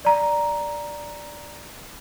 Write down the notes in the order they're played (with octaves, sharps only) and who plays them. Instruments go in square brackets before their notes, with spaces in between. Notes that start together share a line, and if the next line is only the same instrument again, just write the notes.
[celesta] D5 A#5